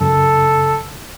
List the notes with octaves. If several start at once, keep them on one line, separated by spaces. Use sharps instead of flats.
F#2 C#3 A4